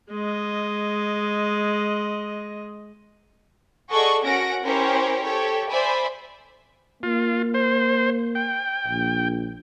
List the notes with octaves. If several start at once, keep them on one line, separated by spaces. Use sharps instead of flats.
G#3 D#5
G#4 A4 D5 D#5 F#5 C#6
C#4 F#4 A#4 F#5 A#6 D7
C#4 E4 G4 A#4 C5 C#5
G4 A4 C#5
C5 D5 E5 G#5 B5
A#3 F4
C5
G5
A#1